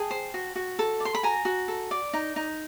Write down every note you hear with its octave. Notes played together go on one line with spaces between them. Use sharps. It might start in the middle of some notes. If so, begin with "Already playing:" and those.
Already playing: G#4 G5 A5
C5
F#4
F#4
A4
D5
C6
B5
F#4 G#5 A#5
F#4
A4
D5
D#4
D#4